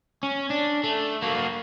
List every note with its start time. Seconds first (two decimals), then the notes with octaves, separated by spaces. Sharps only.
0.23 C#4
0.50 D4
0.84 A3
1.22 A#3 F#4